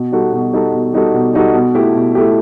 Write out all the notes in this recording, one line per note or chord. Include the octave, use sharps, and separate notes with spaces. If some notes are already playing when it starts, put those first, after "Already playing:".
Already playing: B2
G3 D#4 F#4 A4
B2
G3 D#4 F#4 A4
B2
G3 D#4 F#4 A4
B2
G3 D#4 F#4 A4
B2
A3 E4 G4
B2
A3 E4 G4